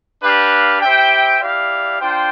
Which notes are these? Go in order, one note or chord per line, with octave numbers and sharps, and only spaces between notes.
D4 G4 B4 F5
E4 G4 C5 E5 G5
E4 G4 D5 F5
D4 F4 C5 G5